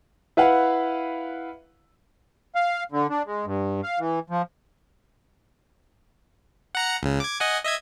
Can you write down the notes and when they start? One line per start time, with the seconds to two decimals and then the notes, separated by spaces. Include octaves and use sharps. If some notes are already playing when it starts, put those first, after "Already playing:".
0.37 E4 B4 F5 F#5
2.55 F5
2.92 D3
3.10 D4
3.26 G#3
3.46 G2
3.83 F5
3.99 E3
4.30 F3
6.75 F#5 A#5 C#7
7.03 C#2 C#3
7.20 D6 G#6
7.40 D#5 F#5 G#5
7.64 D#5 E5 G#6